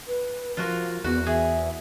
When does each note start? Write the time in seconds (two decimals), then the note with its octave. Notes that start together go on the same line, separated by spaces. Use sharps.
0.07 B4
0.57 F3 F4 F#4 A#4
1.04 E2 B3 F#4
1.27 G#4 E5